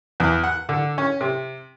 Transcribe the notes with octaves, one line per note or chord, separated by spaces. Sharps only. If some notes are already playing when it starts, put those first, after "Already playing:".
E2
F#5
D3
C#4
C3